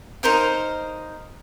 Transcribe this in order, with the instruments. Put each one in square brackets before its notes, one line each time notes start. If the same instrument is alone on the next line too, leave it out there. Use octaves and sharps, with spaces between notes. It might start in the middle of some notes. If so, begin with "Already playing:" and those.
[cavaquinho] D#4 A#4 C5 F5